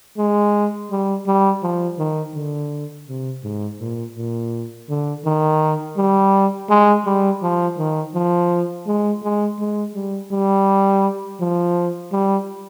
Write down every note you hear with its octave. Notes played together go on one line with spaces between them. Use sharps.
G#3
G3
G3
F3
D#3
D3
C3
G#2
A#2
A#2
D3
D#3
G3
G#3
G3
F3
D#3
F3
G#3
G#3
G#3
G3
G3
F3
G3